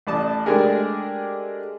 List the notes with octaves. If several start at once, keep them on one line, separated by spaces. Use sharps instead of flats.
A1 D5 A5 D#6
G#3 A3 D4 G4 G#4 A#4